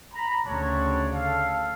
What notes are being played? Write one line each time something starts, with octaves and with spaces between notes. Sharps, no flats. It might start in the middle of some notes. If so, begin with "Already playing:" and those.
A#5 B5
D2 C#3 C4 D4 C#5
A4 F5